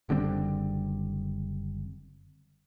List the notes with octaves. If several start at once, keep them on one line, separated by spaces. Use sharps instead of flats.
F#1 D3 G3 C4